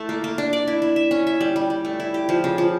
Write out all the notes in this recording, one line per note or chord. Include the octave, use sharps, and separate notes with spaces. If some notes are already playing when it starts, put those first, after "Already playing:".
Already playing: A3 E4
A#3
A#3
D4
D5
E4
E4
E5
C#4
E5
G3
G3
G3
A3
E4
G4
F3
C#3
F3